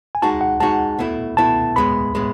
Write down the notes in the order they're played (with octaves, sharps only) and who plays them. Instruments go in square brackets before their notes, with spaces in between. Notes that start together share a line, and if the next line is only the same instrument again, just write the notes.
[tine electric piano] G#5
[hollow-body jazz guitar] G#3 D#4 F#4 [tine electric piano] A5
[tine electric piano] F#5
[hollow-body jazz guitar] G#3 D#4 F#4 [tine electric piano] A5
[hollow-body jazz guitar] B2 A3 E4
[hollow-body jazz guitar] B2 A3 E4 [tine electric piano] A5
[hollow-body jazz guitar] A2 G#3 B3 [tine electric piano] B5
[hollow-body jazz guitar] A2 G#3 B3